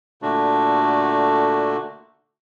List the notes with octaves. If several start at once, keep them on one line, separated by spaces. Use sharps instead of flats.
A#2 D3 A3 D4 F#4